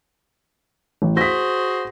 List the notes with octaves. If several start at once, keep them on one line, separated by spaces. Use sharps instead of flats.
A1
F#4 G#4 C5 A#6 B6